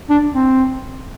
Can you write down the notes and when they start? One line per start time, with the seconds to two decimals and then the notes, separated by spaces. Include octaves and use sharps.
0.10 D4
0.33 C4